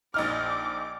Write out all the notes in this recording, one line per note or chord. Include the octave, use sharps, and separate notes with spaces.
A#1 D#4 D6 F6